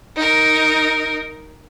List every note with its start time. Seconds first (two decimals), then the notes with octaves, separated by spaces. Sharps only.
0.16 D#4 A#4